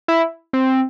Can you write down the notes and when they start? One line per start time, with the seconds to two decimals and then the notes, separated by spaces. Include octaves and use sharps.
0.08 E4
0.53 C4